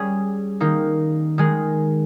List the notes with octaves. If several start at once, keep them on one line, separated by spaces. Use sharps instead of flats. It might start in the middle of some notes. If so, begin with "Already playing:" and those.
Already playing: G3 C#4 G#4
D#3 A#3 D#4
D#3 G#3 D#4 G#4